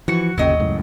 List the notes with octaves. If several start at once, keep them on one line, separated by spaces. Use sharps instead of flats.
E3 F3 F#4 C#7
G1 D#2 A#2 C#3 F#3 D#5 G5
C#2 F#2 A2